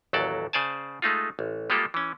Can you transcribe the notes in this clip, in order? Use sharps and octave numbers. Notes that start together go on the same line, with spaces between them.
A1 D#2 F#3 A4 D5 A5
C#3 C5 D5 G#5 A5
G#3 A3 D#4 F4
A1
G3 G#3 A#3 F4 G4 A4
E3 C#4